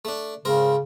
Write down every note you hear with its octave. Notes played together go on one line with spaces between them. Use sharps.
A3 D4
G#2 C#3 C4 A#4